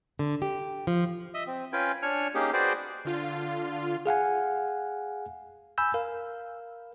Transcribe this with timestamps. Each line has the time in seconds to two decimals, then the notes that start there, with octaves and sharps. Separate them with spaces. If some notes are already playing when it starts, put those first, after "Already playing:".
0.19 D3
0.42 G4
0.87 F3
1.34 D#5 E5
1.47 C4
1.73 C#4 F4 B4 G5 G#5
2.03 D4 C#5 G#5 F6
2.35 A#3 C#4 D#4 G4 G#4
2.53 F#4 G#4 B4 C5 D5 G5
3.05 D3 F4
4.06 G#4 F5 F#5 G#5
5.78 G#5 B5 E6 G6
5.94 A#4 F5